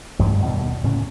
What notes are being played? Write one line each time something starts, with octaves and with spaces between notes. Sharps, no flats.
A1 G2
D#2 B2 G3
A2 C#3 C#4